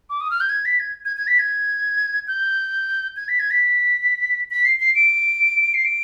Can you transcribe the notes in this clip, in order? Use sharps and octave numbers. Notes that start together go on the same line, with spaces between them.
D6
D#6
F6
G6
G#6
B6
G#6
G#6
G#6
B6
G#6
G6
G#6
B6
G#6
B6
B6
C7
C7
D7
C7
D7